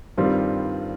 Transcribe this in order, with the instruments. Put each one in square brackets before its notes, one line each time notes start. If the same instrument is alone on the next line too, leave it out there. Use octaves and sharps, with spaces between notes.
[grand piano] G2 D#3 G3 C4 F4